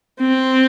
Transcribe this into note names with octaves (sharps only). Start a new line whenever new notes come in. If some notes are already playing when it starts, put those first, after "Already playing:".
C4